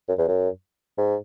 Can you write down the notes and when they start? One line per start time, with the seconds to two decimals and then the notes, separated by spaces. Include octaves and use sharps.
0.08 F#2
0.18 E2
0.28 F#2
0.98 G#2